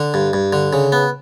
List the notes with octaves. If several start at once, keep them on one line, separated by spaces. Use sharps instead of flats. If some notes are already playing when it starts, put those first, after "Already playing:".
Already playing: D3
G2
G2
D3
C#3
B3